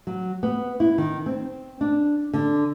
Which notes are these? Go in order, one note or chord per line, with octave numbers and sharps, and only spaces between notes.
F#3
B3
E4
D#3
C4
D4
D3